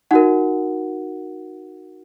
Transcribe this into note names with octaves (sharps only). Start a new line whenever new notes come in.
D#4 F#4 A#4 F#5